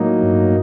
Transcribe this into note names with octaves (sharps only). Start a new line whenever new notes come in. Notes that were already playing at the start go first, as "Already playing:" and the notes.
Already playing: A2 F#3 A#3 D#4
G2